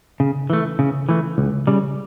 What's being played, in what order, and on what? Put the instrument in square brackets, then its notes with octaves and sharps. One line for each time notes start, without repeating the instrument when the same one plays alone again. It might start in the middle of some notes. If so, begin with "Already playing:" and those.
[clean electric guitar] C#3
E3 A3
C#3
E3 A3
C#2
C#3 G3